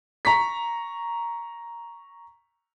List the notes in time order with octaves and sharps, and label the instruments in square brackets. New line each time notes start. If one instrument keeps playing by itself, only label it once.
[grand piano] A#5 C#6 B6